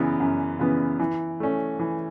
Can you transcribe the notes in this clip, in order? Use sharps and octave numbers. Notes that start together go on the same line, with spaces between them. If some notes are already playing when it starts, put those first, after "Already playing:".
Already playing: F#2 C#3 E3 B3
F#2
C#3 E3 B3
E3
A3 C#4
E3